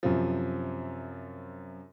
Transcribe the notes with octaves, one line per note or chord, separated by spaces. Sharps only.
F#2 C3 F3